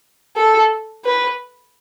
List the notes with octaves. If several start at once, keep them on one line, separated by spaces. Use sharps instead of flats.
A4
B4